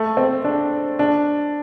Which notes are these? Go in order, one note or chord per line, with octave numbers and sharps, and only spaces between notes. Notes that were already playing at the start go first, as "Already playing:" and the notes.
Already playing: A3
C4
D4
D4